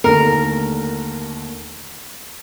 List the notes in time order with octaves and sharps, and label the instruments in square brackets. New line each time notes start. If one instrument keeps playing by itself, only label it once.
[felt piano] D#2 D3 A3 [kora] A#4